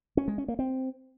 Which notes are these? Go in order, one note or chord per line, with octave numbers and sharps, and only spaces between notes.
C#4
G#3
C#4
A#3
C4